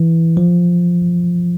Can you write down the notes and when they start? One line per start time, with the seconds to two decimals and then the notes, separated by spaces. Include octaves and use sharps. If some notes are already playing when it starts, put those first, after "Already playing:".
Already playing: E3
0.37 F3